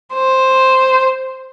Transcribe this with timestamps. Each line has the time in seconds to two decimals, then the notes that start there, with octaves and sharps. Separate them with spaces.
0.14 C5